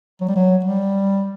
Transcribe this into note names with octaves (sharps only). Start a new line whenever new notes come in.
F#3
G3
F#3
G3